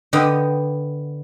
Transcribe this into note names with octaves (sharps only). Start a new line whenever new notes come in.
D3 B3 D#5 G5